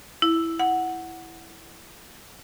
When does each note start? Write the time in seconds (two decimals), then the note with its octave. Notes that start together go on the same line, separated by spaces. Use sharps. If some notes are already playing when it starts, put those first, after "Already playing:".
0.22 E4
0.59 F#5